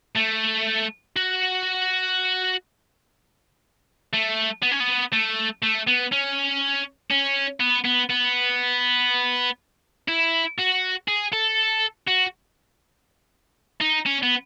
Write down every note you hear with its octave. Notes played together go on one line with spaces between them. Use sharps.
A3
F#4
A3
B3
C#4
B3
A3
A3
B3
C#4
C#4
B3
B3
B3
E4
F#4
G#4
A4
F#4
D#4
C#4
B3